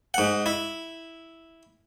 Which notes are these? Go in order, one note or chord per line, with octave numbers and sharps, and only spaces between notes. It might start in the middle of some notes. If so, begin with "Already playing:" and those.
G#2 F#5
E4